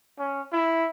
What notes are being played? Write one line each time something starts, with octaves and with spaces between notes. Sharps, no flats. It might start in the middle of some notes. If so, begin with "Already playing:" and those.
C#4
E4